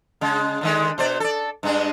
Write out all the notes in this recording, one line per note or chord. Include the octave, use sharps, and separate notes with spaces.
C#3 G#3
D3 D#3 G#3
B2 C5 D5
A4 D5
G2 G#3 D4